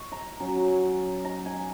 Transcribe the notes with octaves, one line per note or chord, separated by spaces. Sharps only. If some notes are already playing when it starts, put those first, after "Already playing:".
Already playing: C#6
A#5
F#3 C#4
A#5
G#5